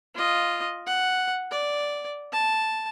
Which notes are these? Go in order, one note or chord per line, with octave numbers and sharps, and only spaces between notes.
F4 D#5
F#5
D5
A5